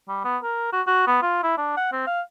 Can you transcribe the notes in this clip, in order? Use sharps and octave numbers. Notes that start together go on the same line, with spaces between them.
G3
B3
A#4
F#4
F#4
B3
F4
E4
D4
F#5
C4
F5